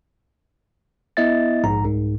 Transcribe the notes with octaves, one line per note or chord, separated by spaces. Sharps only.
B3 E4 D#5 E5 A6
A#1 G#2 A#5
C2 G#2